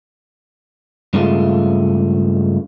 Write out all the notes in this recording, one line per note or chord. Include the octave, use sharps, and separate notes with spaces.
G2 C#3 G#3 A3 F4